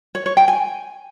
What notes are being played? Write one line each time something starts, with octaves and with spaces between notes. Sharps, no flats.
C#5
C#5
G5
G#5